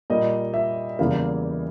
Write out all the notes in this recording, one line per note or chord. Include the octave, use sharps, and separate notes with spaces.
A#2 G3 A#3 D#5
E5
E2 C#3 E3 G3 A#3 F5